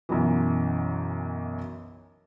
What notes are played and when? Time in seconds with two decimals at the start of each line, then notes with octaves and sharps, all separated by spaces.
0.09 B1 F#2 E3